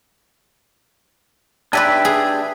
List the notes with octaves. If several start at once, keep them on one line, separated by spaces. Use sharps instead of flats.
D4 G4 B4 D5 E5 G#5
G#4